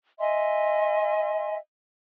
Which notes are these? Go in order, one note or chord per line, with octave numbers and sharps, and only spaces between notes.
D#5 E5 G#5 C6